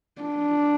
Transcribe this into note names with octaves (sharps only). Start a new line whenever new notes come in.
D4